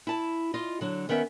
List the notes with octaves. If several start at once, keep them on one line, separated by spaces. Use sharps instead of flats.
E4 A5
F4 D#5
D3 F#3
D#3 B3 C#4 A#4 E5